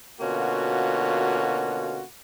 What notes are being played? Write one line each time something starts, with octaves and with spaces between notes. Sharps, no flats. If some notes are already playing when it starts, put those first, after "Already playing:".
B2 D3 A#3 C#4 F4 F#4